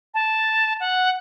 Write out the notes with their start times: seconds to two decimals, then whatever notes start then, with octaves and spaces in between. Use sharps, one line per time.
0.14 A5
0.80 F#5